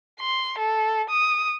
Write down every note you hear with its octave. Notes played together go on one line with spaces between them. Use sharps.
C6
A4
D#6